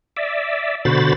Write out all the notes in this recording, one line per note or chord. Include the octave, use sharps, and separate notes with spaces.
D5 E5
B2 D3 F#4 C5 B5 A6